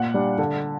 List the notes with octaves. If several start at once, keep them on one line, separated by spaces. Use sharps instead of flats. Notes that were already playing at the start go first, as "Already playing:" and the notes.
Already playing: A#2 F#5
G3 D4
D3